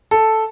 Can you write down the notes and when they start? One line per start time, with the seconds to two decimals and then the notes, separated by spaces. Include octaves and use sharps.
0.11 A4